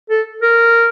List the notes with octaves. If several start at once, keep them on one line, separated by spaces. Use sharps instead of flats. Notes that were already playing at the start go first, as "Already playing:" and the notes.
A4
A#4